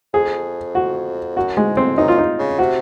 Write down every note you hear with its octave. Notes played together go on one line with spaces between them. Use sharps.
F2 G#4
F#4
F#2 F#4
G#2 G#3
F2 C4
F#2 D#4
F4
D#4
C#3
C3 F#4